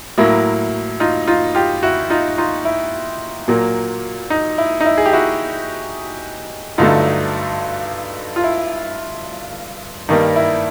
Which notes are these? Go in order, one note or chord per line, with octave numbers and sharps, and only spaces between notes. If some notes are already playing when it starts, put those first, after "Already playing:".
A2 F#3 A#3 E4
D#4 F4
D#4 F4
F4 G4
E4 F#4
D#4 F4
D#4 F4
E4
A#2 F#3 A#3
D#4
E4
D#4
E4
G#4
G4
E4 F#4
G2 D3 F#3 A3 D#4 F4
F4
E4
G2 D#3 G3 A#3 D#4
E4